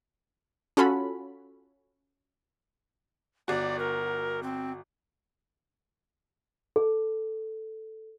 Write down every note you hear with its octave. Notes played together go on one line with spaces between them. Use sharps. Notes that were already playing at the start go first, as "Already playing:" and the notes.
C#4 F4 F#4 A4 B5
G1 F#4 D5
A#4
C4
A4